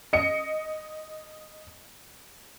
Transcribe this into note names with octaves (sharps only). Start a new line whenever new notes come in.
D#5 C#7